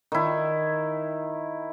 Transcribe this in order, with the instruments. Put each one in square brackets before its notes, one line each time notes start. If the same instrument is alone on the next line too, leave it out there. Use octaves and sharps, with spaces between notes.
[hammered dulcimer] D#3 E4